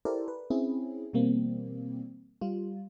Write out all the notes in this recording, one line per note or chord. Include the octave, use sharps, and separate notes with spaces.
E4 G4 A4 A#4 C5 D5
B4
C4 C#4 E4 G#4
B2 E3 G3 A#3 C4
G3 F4